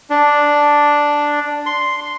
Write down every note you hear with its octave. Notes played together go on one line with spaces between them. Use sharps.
D4
C6